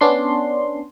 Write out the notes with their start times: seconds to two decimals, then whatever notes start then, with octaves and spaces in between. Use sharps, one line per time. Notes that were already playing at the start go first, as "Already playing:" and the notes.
0.01 B3 C#4 D4 C6